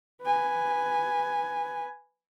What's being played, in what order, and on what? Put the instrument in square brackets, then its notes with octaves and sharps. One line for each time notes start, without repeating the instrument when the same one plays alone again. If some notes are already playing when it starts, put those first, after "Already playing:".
[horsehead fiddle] B4 G#5